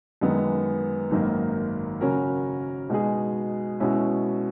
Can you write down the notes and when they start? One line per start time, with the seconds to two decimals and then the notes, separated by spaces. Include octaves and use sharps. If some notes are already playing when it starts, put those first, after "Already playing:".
0.21 F#2 D#3 G#3 B3
1.11 G#1 F#2 D#3 A#3
2.01 C#3 F#3 C#4 F#4 A#4
2.89 B2 G#3 D#4 G#4
3.80 B2 G#3 C#4 E4